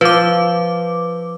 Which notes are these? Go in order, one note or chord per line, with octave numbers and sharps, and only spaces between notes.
F3 B4 D6